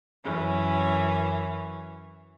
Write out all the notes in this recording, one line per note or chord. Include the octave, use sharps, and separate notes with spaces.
F#2 E3 C#4